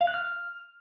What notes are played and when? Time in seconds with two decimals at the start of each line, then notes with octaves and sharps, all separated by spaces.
0.01 F5
0.07 F#6
0.14 F6